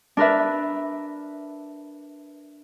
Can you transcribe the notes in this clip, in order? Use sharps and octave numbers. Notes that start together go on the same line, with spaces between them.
D4 A#4 B4 E5